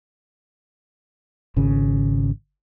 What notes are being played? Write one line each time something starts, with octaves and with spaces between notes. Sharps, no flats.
G#1 C#3